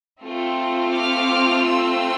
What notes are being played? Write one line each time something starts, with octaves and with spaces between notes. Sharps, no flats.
A3 C4 F4
D6 F6
C6 E6